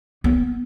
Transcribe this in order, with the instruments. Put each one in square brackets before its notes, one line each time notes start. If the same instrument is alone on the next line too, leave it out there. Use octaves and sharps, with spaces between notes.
[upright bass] B3